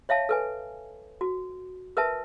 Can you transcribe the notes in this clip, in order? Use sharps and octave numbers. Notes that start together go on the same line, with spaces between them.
C#5 E5 F5 A5
A4 B4 G#5
F#4
A#4 B4 E5 A5